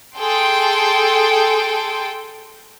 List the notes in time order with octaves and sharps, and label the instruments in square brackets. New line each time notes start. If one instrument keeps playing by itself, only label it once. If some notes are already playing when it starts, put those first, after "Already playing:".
[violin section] G#4 A4 G5 C6